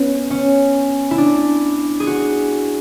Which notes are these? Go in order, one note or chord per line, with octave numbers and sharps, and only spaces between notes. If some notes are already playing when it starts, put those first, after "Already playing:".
Already playing: B3 C#4
C#4
E4
D4
G#4
F#4